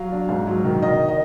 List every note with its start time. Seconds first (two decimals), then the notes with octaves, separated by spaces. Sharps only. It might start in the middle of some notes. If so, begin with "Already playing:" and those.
Already playing: F#3 F5
0.12 D4
0.29 G#2
0.47 F#3
0.64 D#3
0.82 D#3 D#5
1.09 D#5